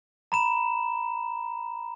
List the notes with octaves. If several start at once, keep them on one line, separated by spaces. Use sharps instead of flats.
A#5 B5 E7